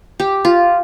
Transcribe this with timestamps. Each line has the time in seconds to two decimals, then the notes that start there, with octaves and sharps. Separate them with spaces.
0.20 G4
0.45 F4